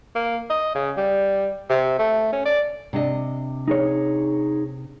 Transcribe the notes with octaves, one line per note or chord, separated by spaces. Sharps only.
A#3
D#5
C#3
G3
C3
A3
C#4
D5
C3 D4 D#5
D#4 G#4 C#5